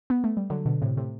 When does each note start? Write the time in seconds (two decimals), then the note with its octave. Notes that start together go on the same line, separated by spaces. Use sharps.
0.10 B3
0.24 A3
0.37 G3
0.50 D3 F#3
0.65 B2 D3
0.82 A2 C3
0.97 A2 C3